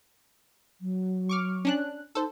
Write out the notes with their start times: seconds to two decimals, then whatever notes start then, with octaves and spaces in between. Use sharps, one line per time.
0.81 F#3
1.29 C#6 D6 F6
1.65 C#4 D4 F#6
2.15 D#4 A4 C5